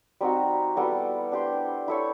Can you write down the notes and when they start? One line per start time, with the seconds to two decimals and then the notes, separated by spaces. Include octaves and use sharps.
0.21 G3 C4 D#4 F#4
0.76 G3 B3 E4 A4
1.32 D4 G4 C5
1.88 E4 A4 C#5